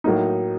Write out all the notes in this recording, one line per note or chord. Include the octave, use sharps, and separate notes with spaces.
A2 F#3 A#3 D#4